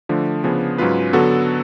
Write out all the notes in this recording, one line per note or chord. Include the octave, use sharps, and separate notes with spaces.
D3 F3 A3 D4
C#3 F3 B3 D4 G#4
G#2 F#3 C#4 F4 B4
D3 F#3 B3 F#4 A4